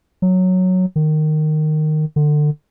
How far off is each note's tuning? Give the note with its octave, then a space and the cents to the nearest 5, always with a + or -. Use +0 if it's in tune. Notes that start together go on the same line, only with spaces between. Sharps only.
F#3 -5
D#3 -15
D3 +25